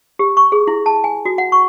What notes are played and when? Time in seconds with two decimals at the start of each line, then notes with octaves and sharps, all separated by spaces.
0.19 G4
0.37 C#6
0.52 G#4
0.67 E4
0.86 A5
1.04 G#5
1.25 F#4
1.38 F#5
1.52 C#6